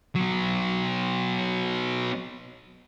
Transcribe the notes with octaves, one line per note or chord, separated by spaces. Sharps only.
F#3 B3